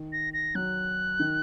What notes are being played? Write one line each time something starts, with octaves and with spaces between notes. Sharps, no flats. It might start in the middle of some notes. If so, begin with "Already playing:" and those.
Already playing: D#3
A#6
A#6
F#3 F#6
D#3